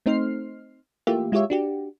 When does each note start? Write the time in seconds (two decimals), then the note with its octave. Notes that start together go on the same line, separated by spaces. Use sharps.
0.06 A3 C4 D#4 C5 F6 C7
1.07 E3 A3 A#3 F4 G4 E5
1.32 G#3 E4 F4 G4 C#5 E5
1.50 D4 F#4 G4